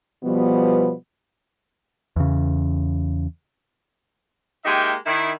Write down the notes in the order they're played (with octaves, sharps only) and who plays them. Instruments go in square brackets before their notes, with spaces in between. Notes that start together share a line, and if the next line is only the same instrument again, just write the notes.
[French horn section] B2 F3 G3 B3
[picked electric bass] E2 C#3
[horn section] G#3 A#3 D#4 G4 E5 G5
D#3 E4